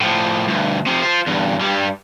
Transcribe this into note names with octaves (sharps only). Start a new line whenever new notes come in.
A2 F3
D2 G2
C3 F3
F4 C5
E2 G2
G2 G3